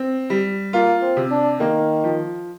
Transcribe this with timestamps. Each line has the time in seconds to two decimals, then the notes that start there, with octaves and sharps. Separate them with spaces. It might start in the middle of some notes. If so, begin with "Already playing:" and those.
Already playing: C4
0.30 G3
0.73 A#3 F4
1.02 C4
1.17 C3
1.31 D4
1.60 D#3 A#3
2.04 F3